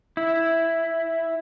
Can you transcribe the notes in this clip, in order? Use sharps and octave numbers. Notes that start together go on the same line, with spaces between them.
E4